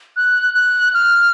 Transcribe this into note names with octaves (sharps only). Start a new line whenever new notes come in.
F#6
F#6
F6